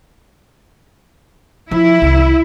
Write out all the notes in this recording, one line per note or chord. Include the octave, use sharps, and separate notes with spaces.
F3 E4
C2 D#3